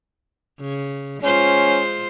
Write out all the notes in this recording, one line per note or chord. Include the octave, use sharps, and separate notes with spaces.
C#3
G#3 C#4 F4 C5